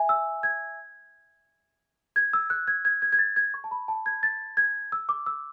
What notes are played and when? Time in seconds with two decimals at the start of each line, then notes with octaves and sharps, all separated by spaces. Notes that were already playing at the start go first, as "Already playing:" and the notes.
Already playing: E5 G#5
0.09 E6
0.43 G#6
2.16 G#6
2.33 E6
2.50 F#6
2.68 G#6
2.85 G#6
3.02 G#6
3.12 G#6
3.19 A6
3.36 G#6
3.54 C#6
3.64 A5
3.71 B5
3.88 A5
4.06 G#6
4.23 A6
4.57 G#6
4.92 E6
5.09 D6
5.26 E6